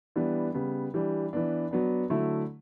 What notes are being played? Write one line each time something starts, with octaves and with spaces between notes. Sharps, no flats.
E3 G3 B3 D4
C#3 G3 B3
E3 G3 D4
E3 B3 D4
F#3 B3 D4
D3 F#3 A3 E4